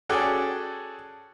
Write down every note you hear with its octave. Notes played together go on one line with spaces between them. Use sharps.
C#4 F#4 G#4 A4 D5 G5